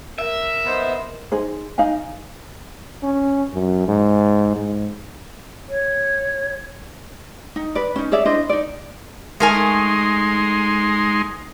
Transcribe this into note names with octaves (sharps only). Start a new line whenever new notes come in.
A#4 E5
B3 D#4 C5
D#4 G#4 C5
D#4 D#5 F5 G#5
C#4
F#2
G#2
G#2
C#5
D#4
B4 D5
C#4 D#4
G#4 C#5 D5 E5
D4 E4 C5 D#5
D#4 D5
G#3 A3 D#4 A#4 G#5 C6